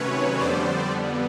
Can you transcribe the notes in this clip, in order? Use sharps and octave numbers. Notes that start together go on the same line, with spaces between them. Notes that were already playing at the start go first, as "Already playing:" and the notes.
Already playing: C3 D#3 F#3 A3 C#4 B4 C#5
F2 D3 G3 B3 C5 D5